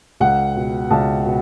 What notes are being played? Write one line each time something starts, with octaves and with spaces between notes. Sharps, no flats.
C#2 F#5
B2
C#2 A5
B2